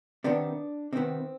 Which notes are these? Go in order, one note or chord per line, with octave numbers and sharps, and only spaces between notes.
C3 D#3 B3 D4
C3 D#3 B3 C4